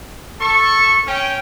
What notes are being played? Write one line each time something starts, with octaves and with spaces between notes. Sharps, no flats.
A4 C#6
C#4 G5